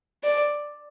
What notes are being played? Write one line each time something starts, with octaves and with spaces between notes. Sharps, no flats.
D5